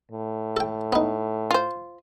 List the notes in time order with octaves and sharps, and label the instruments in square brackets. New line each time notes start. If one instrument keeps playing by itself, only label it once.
[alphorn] A2
[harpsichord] A4 G5
B3 D#4
[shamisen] F4 C5